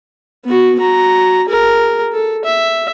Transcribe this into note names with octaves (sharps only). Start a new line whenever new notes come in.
B3 F#4
F#4 A#5
G#4 A#4
A4
E5